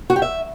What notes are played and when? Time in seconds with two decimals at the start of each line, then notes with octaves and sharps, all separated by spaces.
0.10 F#4
0.16 G4
0.22 E5